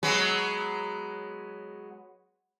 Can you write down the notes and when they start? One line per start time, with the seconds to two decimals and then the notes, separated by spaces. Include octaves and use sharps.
0.03 F#3 G#3 B3